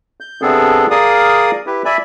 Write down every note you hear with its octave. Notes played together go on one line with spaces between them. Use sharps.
G6
C3 B3 C4 D4 G#4 A4
G#4 A#4 D5 F5 D#6
E4 G4 B4
D5 E5 G#5 B5